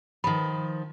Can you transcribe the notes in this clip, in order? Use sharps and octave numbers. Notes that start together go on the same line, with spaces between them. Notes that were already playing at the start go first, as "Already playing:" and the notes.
D#3 F3 B5